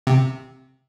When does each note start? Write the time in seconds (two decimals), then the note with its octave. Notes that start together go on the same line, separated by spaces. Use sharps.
0.07 C3